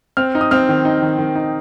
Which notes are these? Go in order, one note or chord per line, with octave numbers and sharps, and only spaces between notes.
C4 F6
D#4
D#6
C4 F6
D#3
D#4
D#3
D#3
D#4